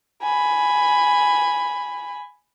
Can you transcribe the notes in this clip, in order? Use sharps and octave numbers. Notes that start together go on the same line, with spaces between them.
G#5 B5